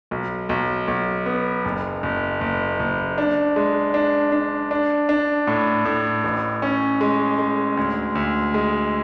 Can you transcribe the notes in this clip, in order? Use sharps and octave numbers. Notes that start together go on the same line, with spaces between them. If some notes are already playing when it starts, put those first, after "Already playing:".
B1
B1
B1
B3
F#1
F#1
F#1
F#1
D4
G#3
D4
D4
D4
D4
A2
A2
A1
C#4
G#3
G#3
D2
D2
G#3